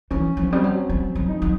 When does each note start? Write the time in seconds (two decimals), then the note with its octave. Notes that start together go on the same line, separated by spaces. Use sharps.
0.11 E3 C#4
0.37 F3
0.43 C#4
0.51 G3 C4
0.64 F#3
0.89 F#3
1.15 F#3
1.28 D#4
1.42 F#3